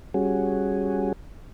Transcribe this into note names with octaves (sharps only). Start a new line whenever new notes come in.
G3 C#4 F#4 G#4